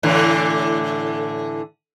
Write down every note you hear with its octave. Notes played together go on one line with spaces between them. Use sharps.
A2 D3 E3